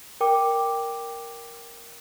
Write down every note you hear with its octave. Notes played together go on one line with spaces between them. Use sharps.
A#4 G5 D6